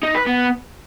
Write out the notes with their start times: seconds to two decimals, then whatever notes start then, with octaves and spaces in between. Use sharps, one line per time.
0.03 D#4
0.15 B4
0.27 B3